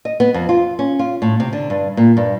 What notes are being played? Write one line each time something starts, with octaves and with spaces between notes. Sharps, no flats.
D#5
B3
F2
F4
C#4
F4
A2
C3
D3
G2
A#2
G2